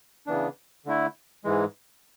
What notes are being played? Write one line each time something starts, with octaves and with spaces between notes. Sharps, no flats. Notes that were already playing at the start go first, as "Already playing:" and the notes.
C#3 E3 B3 D4
D3 A3 E4
G#2 E3 G#3